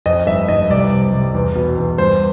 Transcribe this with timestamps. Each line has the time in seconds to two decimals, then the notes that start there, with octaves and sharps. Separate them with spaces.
0.06 F2 D#5
0.27 G1 E5
0.48 G1 D#5
0.70 C2 D5
0.92 C3
1.13 C2
1.34 E2
1.55 B2
1.77 E2
1.98 G2 C5